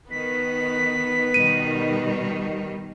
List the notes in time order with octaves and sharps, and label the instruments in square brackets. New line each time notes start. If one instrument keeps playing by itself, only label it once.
[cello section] D#3 [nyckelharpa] B3 B4 [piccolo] B6
[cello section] B2 D#3 G3 [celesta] D#7